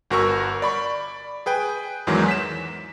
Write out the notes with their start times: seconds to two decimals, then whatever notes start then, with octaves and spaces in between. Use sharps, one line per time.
0.10 G1 F#4 A#4 C#6 E6
0.62 D5 B5 C#6
1.46 G#4 B4 G5
2.07 E2 G#2 D#3 E3 F#3 G#3
2.28 B6 E7